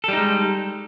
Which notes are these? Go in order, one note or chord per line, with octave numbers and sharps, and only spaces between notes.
G3 G#3 D#4 A4